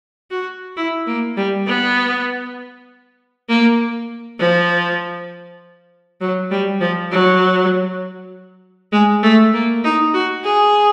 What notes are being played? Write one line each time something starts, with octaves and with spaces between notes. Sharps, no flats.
F#4
E4
A#3
G3
B3
A#3
F3
F#3
G3
F3
F#3
G#3
A3
A#3
D#4
F#4
G#4